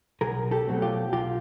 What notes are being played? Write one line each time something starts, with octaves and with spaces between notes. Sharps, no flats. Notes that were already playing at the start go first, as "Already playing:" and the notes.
B1 G#4 A#4
G4 A4
B2 F#3 A3 C4
F4 G4
B1 F4 G4